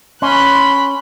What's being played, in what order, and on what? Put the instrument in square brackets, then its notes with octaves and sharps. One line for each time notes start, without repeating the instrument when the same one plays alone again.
[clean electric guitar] C#4 [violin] B5 F#6 [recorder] C6